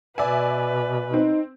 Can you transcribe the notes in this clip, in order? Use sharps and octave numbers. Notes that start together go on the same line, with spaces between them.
B2 B4 D5 E5 G#5
C4 D#4